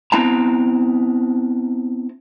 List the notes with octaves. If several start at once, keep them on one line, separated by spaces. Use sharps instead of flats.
B3 C4 E4 A5 A#5